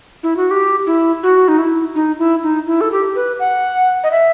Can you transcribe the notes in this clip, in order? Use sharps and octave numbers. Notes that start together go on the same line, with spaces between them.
E4
F#4
G4
E4
F#4
D#4
E4
D#4
E4
D#4
E4
A4
G4
B4
F#5
D#5
E5